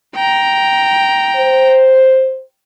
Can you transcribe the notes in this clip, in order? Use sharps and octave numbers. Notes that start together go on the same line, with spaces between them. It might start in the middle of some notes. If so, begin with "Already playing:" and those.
G5 A#5
C5